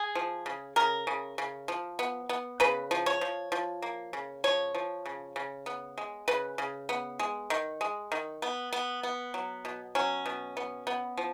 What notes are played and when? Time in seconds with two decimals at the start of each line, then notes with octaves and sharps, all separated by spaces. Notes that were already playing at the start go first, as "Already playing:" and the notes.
Already playing: G#4
0.15 F3
0.46 C#3
0.76 C#3 A#4
1.07 C#3
1.38 C#3
1.68 F3
1.99 B3
2.29 B3
2.60 C#3 B4
2.91 F3
3.06 C#5
3.21 F3
3.52 F3
3.82 A#3
4.13 C#3
4.44 F3 C#5
4.75 F3
5.06 C#3
5.36 C#3
5.66 B3
5.98 G#3
6.28 C#3 B4
6.58 C#3
6.89 B3
7.19 G#3
7.50 D#3
7.81 G#3
8.12 D#3
8.42 B3
8.73 B3
9.03 B3
9.34 F#3
9.65 B2
9.95 F#3 C#4
10.26 B2
10.57 B3
10.87 B3
11.17 F3